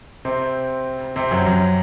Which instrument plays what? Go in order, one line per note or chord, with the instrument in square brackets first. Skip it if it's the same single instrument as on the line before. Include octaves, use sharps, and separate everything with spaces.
[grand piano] C3 C4
C3 C4
F#2 F#3
F#2 F#3